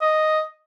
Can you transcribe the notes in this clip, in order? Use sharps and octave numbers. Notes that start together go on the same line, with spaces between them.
D#5